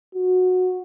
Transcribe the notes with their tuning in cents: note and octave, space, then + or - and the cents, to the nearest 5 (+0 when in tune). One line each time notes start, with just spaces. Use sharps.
F#4 -15